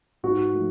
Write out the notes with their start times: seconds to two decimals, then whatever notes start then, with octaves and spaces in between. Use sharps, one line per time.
0.23 G#2 F#4
0.53 F3 A3